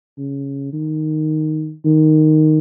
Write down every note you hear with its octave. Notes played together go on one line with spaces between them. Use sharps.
C#3
D#3
D#3